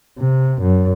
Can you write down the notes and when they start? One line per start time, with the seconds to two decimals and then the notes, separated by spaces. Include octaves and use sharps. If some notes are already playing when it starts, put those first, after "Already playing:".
0.19 C3
0.62 F#2